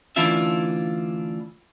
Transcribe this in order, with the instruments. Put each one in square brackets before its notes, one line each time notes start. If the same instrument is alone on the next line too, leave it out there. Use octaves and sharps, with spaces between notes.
[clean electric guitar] D2 E3 C#4 D4 F4 E5